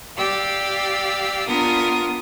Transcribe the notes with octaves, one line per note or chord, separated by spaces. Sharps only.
G4 D5 F5 E6
B3 D4 F4 A#4 D#6